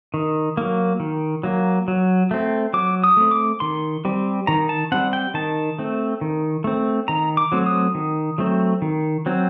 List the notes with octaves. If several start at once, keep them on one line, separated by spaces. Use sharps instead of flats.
D#3
F#3 A#3
D#3
F#3 A#3
F#3
A3 C4
F#3 D6
D#6
A3 C4
D6
D#3 C6
G3 C4
D#3 A#5
A5
G3 C4 F#5
G5
D#3 A5
A3 C4
D#3
A3 C4
D#3 A#5
D6
F#3 A3 C4
D#6
D#3
F#3 A3 C4
D#3
F#3 C4